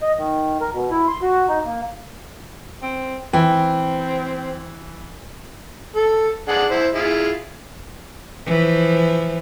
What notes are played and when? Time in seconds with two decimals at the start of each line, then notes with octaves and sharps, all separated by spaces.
0.02 D#5
0.17 D#3
0.61 A#4
0.72 B2
0.91 E4
1.08 C6
1.22 F#4
1.48 D#4
1.65 A#3
2.83 C4
3.33 E3 C4 G5
5.96 A4
6.49 D4 G#4 F#5
6.70 E4 C5
6.95 E4 F4 G#4
8.46 E3 F3